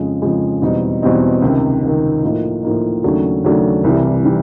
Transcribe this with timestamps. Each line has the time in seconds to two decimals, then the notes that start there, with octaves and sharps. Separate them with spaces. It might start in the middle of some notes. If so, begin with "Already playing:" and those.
Already playing: F2 C#3 F3 G#3
0.22 F2 C#3 F3 G#3
0.62 E2 B2 G3 C4 D#4
1.02 E2 B2 G3 C4 D#4
1.42 C#2 C3 D#3
1.83 C#2 C3 D#3
2.23 A2 F3 A#3 D#4
2.63 A2 F3 A#3 D#4
3.04 D#2 C#3 F#3 A3 D4
3.44 D#2 C#3 F#3 A3 D4
3.84 C2 C3 E3 G3
4.25 C3 E3 G3